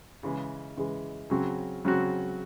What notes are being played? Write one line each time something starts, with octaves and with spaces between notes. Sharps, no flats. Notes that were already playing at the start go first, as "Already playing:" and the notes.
C#3 E3 G#3
C#3 E3 G#3
C#3 F#3 C4 F#4
C#3 F#3 C4 F#4